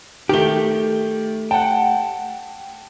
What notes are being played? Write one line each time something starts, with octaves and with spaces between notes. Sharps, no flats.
D#3 A3 G4 G7
F#5 G5 A5